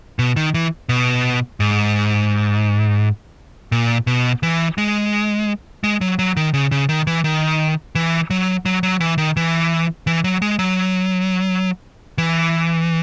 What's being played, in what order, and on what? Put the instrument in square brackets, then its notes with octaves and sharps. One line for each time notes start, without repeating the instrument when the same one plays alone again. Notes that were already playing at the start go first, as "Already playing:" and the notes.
[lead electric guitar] B2
D#3
E3
B2
G#2
A#2
B2
E3
G#3
G#3
F#3
F#3
D#3
C#3
C#3
D#3
E3
D#3
E3
F#3
F#3
F#3
E3
D#3
E3
E3
F#3
G#3
F#3
E3